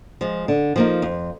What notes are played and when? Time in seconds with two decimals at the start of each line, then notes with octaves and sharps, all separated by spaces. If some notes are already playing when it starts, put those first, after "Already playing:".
0.21 F3 G#3
0.48 D3
0.76 F3 A#3 D#4
1.02 F2